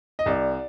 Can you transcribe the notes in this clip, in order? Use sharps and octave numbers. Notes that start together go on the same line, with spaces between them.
D#5
C2 D5